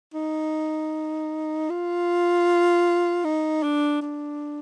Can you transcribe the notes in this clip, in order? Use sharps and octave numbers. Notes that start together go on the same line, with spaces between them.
D#4
F4
D#4
D4
D4